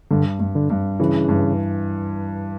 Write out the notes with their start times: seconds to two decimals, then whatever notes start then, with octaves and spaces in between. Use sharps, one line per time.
0.11 G2 D3
0.40 G2
0.55 D3
0.70 G2
0.99 C#3 E3
1.29 G2